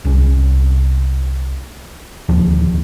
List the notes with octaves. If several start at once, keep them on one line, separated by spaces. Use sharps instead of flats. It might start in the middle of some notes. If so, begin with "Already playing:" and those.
C2 C#4
D1 D#2 F3